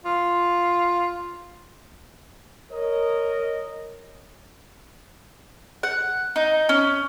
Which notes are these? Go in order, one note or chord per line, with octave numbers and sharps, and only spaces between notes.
F4
A#4 C#5 D#5
F#5
D#4
C#4